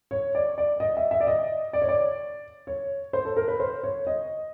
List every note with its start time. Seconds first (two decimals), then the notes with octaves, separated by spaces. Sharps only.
0.11 C#5
0.35 D5
0.58 D5
0.80 D#5
0.97 E5
1.11 E5
1.21 D5
1.27 D#5
1.73 D5
1.82 C#5
1.89 D5
2.67 C#5
3.13 C5
3.25 A4
3.36 A#4
3.48 B4
3.60 C5
3.83 C#5
4.07 D#5